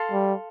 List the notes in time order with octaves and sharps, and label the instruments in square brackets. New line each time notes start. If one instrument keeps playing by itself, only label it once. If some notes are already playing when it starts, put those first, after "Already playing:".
Already playing: [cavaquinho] A4 F5 C6
[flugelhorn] G3